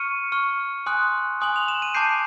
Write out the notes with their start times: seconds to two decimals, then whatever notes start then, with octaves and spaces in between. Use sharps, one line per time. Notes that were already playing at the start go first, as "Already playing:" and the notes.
Already playing: C#6 F6 C#7 D#7
0.32 C#6 F6
0.86 G#5 C6 D#6 F#6
1.41 G#5 C6 D#6 F#6 F#7
1.56 F7
1.68 E7
1.82 D#7
1.94 A5 D6 G6 C7 D7